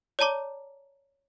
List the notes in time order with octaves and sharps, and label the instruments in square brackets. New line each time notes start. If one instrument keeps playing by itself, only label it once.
[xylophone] C#5 D5 A5 A#5 D6